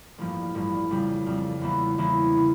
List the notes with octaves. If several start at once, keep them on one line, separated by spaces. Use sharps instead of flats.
A1 G2 F3 A#3
A1 G2 F3 A#3
F2 C#3 G3
F2 C#3 G3
E2 E3 A#3 E4
E2 E3 A#3 E4
C#3